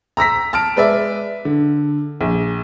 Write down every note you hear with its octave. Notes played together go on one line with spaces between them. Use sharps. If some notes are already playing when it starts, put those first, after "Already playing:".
A#5 E6 A#6 B6
A5 F6 D7
G#3 B4 D5 E5
D3
A#1